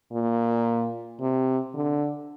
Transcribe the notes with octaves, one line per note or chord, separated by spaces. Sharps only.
A#2
C3
D3